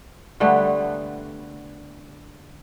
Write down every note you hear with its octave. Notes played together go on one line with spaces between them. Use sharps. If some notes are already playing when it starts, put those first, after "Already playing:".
D3 G3 A3 B3